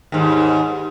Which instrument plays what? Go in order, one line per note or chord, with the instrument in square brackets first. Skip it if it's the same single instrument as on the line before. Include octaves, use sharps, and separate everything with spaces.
[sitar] D#2 G#2